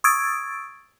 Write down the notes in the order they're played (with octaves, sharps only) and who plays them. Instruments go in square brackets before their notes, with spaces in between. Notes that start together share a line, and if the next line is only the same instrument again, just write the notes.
[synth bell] C#6 D#6 E6 G#6 A6 D7